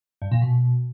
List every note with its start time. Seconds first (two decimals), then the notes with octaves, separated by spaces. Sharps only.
0.22 G2
0.31 A#2
0.41 B2